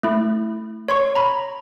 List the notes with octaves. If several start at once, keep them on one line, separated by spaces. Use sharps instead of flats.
A3 E4
C#5 C6 C#6
A#5 B5